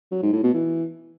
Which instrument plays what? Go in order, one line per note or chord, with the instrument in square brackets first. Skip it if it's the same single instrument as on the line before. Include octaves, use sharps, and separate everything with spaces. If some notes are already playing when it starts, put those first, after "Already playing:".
[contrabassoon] F#3
G#2
A2
B2
E3